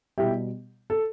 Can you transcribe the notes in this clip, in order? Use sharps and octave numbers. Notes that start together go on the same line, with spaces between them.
B2 G3 E4 G4
A4